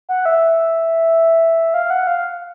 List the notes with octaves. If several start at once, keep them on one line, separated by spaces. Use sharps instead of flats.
F#5
E5
F5
F#5
F5